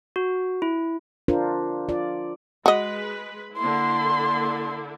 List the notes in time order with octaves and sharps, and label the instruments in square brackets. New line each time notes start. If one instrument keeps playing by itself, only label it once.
[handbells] F#4
E4
[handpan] D4 F4 A#4 C5
F4 D5
[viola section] G#3 B4 [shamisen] F#4 D#5
[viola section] D3 A#3 E4 [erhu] C6